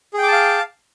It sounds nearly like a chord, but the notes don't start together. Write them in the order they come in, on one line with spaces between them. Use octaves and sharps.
G#4 G5 D6 A5 F5